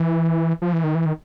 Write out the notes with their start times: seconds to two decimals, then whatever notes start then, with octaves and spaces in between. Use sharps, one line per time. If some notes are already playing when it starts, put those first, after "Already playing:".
Already playing: E3
0.62 F3
0.73 E3
0.84 D#3
0.95 E3
1.06 D#3